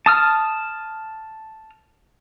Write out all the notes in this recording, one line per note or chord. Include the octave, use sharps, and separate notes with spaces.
A5 D#6 F6